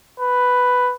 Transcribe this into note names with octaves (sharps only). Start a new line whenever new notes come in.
B4